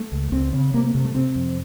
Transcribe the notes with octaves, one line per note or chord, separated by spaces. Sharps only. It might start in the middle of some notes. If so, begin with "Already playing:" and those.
Already playing: A3
C#2
C#2 C4
C#3 C4
C3 A#3
A#3
C3 A3
A3
C3 C4
F2